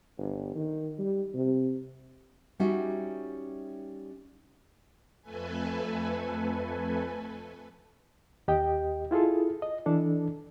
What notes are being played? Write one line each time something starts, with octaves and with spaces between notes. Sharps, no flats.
G1
D#3
G3
C3
G3 C#4 D#4 F#4 E5
F2 A3 A4 B4 G#5
D#2 G4 D#5 G5
E4 F4 G#4 A4
D#5
E3 D4 A4